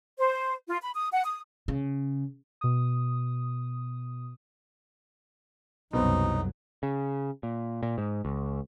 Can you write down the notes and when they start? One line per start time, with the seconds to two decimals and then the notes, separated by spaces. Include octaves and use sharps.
0.18 C5
0.67 F4
0.81 B5
0.95 D#6
1.12 F#5
1.24 D#6
1.68 C#3
2.61 B2 D#6
5.93 F#1 C2 B2 F#3 B3 C4 D#4
6.83 C#3
7.43 A#2
7.83 A#2
7.98 G#2
8.25 C#2